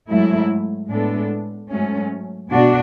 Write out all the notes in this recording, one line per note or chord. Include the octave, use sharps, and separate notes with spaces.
G#2 F#3 A3 E4
A2 G#3 B3 D4 A4
G#2 F#3 A3 C#4
B2 A3 D4 F#4